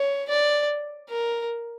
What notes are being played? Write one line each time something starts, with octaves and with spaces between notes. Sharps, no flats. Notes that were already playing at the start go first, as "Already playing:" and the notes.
Already playing: C#5
D5
A#4